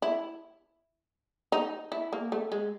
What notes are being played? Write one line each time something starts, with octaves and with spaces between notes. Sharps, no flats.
E4
D#4
E4
A#3
A3
G#3